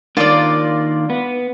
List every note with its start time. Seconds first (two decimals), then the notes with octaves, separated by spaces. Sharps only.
0.17 D#3 A#3 D4 F4 D5
1.10 B3